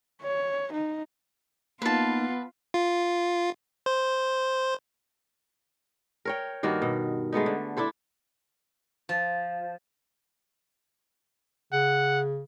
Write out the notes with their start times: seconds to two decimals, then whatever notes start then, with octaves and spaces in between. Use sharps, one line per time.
0.22 C#5
0.73 D#4
1.82 A#3 B3 D#4 F4 B4 A5
2.74 F4
3.86 C5
6.25 A#4 C#5 G5
6.63 G2 D#3 A#3 F#4
6.82 B2
7.33 G#3 A3 B3 D#4
7.46 D3
7.77 D4 E4 A4 C5
9.09 F3
11.73 C#3 F#5